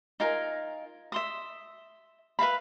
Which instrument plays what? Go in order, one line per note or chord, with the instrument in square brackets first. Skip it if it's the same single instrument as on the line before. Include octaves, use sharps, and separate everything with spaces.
[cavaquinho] D#4 F4 A#4 G#5
E5 C6 D#6
B4 E5 F5 B5